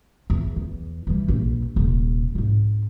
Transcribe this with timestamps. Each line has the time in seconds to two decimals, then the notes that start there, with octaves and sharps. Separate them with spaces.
0.30 E2
0.56 E2
1.07 E3 G3
1.28 A#1 G2
1.76 D#1 C3
2.35 G#2 C4